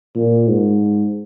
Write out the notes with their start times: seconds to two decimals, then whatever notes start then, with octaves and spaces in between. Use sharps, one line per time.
0.15 A#2
0.48 G#2